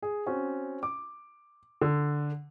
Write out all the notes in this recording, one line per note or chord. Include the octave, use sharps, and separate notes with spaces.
G#4
C4 C#4 F#4
D6
D3